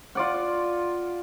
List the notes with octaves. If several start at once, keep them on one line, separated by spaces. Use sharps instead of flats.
F4 D5 F#5